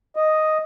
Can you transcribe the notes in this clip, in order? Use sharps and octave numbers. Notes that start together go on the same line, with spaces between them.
D#5